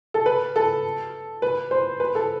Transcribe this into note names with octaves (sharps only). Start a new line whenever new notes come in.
A4
B4
A4
B4
C5
B4
A4